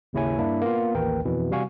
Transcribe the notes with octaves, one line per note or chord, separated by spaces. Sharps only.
G#1 D#2 C#3 E4 C#5 G#5
G2 A#3 D4 E4
A#3 B3 F4
A1 D#2 A#4 B4 G5
F2 B2 E3
C3 G3 F#4 F5 G#5 C#6